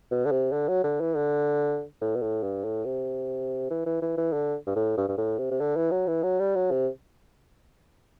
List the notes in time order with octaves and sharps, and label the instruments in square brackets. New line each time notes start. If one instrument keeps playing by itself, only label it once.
[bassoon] B2
D3
C3
D3
F#3
D3
E3
D3
A2
B2
A2
G2
A2
C3
E3
E3
E3
E3
D3
G2
A2
G2
G2
A2
C3
C3
D3
E3
F#3
E3
F#3
G3
F#3
C3